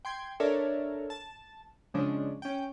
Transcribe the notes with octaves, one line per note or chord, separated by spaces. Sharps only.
G5 C6 G#6
D4 A4 A#4 C#5 D5 E5
A5
C#3 F3 G#3 C#4 D4
C#4 G5